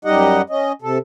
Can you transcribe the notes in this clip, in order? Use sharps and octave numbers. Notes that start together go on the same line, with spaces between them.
F#2 G3 D#4 G4 D#5 F#5
C#4 D#5
C3 A4